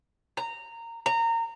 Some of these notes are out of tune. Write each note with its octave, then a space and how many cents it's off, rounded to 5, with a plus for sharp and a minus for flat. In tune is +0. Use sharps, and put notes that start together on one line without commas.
A#5 -15
A#5 -25